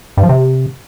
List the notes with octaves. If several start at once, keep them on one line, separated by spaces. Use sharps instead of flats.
G2
F3
C3